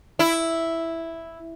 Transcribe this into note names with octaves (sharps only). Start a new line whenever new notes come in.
E4